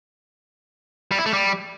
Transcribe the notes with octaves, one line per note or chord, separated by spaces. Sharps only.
G3
E4
A3
G3